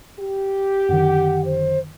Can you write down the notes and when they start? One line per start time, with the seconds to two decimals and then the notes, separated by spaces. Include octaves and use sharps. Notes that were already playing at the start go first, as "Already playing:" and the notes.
0.20 G4
0.89 F#2 D3 D#3 F#5
1.45 C5